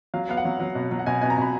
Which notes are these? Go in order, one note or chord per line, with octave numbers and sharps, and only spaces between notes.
F#3 F5
B3 F5
F#5
F#3
F#3
B2
F#3
F#5
B2 G#5
B2 G#5
A#5
B2 B5